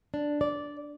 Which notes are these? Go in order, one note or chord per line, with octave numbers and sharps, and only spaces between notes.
D4
D5